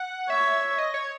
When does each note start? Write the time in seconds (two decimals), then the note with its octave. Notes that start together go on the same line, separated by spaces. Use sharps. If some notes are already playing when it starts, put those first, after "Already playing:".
Already playing: F#5
0.30 C#5 E5
0.78 D#5
0.94 C#5